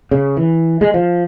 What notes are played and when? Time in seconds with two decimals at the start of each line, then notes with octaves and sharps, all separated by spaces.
0.11 C#3
0.37 E3
0.81 G#3
0.94 F3